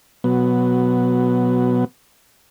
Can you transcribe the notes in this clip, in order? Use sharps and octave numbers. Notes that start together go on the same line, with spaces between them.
B2 F#3 B3